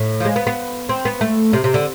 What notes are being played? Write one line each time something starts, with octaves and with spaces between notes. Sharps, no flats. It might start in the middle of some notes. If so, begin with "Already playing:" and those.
Already playing: A2
F3
G#3
B3
B3
C4
B3
A3
C3
C3
D3